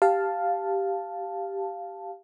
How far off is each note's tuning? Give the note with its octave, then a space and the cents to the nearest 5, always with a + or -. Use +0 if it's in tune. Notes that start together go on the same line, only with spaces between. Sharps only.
G4 +0 F5 +0 A5 +0